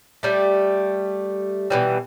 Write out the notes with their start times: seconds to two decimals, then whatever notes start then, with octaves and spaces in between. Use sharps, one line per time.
0.23 G3 A3
1.70 B2 E3 G3